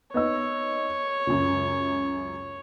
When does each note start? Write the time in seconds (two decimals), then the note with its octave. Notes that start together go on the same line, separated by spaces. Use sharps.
0.14 B3 D#4 C#5 E6
1.27 C#2 F#2